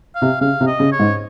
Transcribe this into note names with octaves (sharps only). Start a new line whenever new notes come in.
F5
C3
C#3 F5
C3
D#5
C#3
C#5
G#2